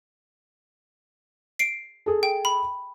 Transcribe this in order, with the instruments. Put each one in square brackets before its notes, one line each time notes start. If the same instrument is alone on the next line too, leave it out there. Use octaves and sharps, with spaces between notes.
[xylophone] C7 D7
[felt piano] G#4 A4
[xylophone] G5
B5